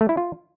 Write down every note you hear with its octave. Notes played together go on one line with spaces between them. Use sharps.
A3
E4
F4